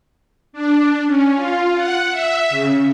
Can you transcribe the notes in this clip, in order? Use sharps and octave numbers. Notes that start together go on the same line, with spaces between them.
D4
C#4
F4
F#5
E5
C#3